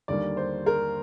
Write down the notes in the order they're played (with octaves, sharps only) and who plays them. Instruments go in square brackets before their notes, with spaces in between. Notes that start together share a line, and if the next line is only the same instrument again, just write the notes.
[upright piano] D#2 D3 G3 A#3 D5
C5
A#4